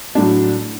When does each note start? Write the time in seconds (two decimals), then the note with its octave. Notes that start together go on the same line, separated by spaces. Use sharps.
0.15 D4
0.18 A2
0.20 F#3